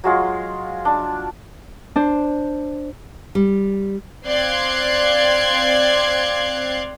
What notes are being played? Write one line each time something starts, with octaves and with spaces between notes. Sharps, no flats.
F#3 G#3 F4
D4
D4 C5
G3
C4 D5 F5 C6 F#6 G#6